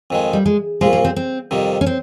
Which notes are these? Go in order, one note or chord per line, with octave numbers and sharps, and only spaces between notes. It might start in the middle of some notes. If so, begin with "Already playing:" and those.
F2 D#3 G#3
G3
G#3
C2 A#2 F3 G#3
A#3
C4
C4
F2 C3 D#3 G3
C#4
C4